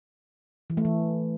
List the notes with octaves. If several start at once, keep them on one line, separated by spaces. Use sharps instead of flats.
E3
A3
E3